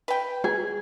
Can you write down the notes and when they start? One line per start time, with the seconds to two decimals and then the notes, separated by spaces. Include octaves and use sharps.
0.08 B4 G5
0.44 G#4